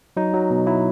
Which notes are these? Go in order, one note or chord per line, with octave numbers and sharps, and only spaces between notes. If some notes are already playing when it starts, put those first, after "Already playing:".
F#3 D#4
F#3
B2
F#3 E4